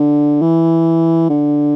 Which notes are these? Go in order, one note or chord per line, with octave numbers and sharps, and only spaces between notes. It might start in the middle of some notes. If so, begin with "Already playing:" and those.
Already playing: D3
E3
D3